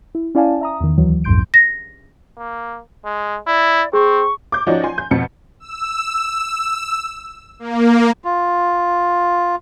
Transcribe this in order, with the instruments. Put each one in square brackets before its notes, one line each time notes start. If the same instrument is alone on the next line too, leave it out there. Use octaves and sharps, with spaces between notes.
[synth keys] E4
C#4 E4 D5 F5 G#5 A5
E5 A#5 D#6
E2 D#3
D2 E3 F#3
B1 F2 G#2 C6 G6 D7
[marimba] A#6
[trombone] A#3
G#3
[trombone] E4 [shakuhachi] D5
[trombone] C4 [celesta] G#4 [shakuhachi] C#6
[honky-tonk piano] D6 G6
F3 C#4 D#4 F#4 D5
G#5 C6
G6
F2 B2 C#7
[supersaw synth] E6
A#3
[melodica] F4